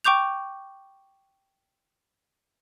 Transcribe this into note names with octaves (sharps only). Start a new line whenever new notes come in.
G5 C#6 D6 G6 F7